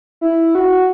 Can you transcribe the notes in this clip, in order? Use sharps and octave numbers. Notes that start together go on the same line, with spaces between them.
E4
F#4